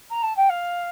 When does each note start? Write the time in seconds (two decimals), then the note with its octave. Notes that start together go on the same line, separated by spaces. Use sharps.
0.10 A#5
0.22 A5
0.36 G5
0.49 F5